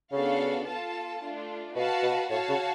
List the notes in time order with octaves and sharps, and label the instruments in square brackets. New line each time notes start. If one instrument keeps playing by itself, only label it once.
[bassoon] C#3 [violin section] B3 D4 F#4 A4 F5
[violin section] F4 A4 F5 A5
A3 D4 F4
[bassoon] B2 [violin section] F#4 B4 F5 A5
[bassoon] B2
[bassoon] A2 [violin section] F#4 C#5 F5 A5
[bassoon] C#3